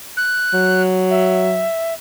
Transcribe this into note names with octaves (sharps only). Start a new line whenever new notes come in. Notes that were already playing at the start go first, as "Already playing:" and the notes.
F#6
F#3
E5